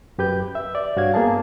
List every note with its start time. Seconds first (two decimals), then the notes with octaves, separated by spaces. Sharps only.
0.18 F#2 G4 B4 G6
0.55 E5
0.75 D5
0.97 G2 F#4 C#5 F5 G#6
1.14 A#3 B3 G#4 A5